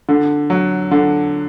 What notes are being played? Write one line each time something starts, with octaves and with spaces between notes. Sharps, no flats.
D3
F#3
D3